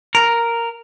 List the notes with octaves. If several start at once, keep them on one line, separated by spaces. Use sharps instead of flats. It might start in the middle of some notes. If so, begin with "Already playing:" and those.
A#4